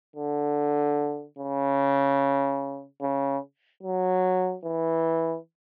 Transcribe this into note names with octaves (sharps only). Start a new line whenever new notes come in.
D3
C#3
C#3
F#3
E3